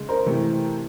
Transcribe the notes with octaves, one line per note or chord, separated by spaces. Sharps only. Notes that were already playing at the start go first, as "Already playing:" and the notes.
Already playing: C#3 G#3
A#4 C5
C3 E3 A3